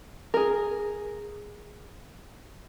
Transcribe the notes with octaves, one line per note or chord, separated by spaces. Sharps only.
G#4 A#4